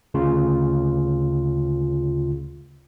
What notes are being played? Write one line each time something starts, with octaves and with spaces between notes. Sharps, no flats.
D2 C#3 F4